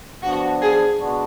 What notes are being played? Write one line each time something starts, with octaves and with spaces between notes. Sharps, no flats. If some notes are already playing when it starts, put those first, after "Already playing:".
F3 B3 D4 F#4
G#4
B2 G#3 B3 D4 F#4